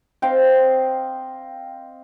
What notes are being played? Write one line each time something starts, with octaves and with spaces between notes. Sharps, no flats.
C4 D#5 F5 G5